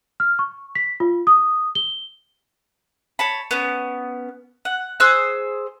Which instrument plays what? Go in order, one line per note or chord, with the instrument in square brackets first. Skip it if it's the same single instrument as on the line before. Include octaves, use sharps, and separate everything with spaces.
[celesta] F6
C#6
B6
F4
D#6
G7
[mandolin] C#5 A5 B5
B3 C#4
F#5
G#4 C5 E6 F#6